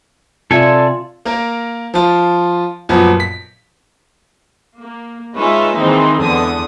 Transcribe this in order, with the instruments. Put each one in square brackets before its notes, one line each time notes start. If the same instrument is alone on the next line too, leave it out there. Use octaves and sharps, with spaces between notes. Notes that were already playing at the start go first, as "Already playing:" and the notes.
[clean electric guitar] C3 E5 [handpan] F4 [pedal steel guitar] A4 G#5 [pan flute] D5
[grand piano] A#3 A#4
F3 F4
F#2 A#2 F3 B3
B6
[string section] A#3
G#3 C#4 D#4 F4 B4 E5
D#3 E3 G#3 A#3 C4 D#4
E2 D3 B3 D#6